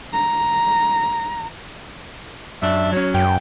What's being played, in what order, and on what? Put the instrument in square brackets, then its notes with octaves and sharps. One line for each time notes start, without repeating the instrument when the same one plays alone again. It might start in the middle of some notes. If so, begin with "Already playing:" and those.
[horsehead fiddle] A#5
[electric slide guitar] F#2 D4 [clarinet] E5
[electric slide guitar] F#3 C#4 [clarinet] C#5
[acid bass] F#2 [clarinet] G5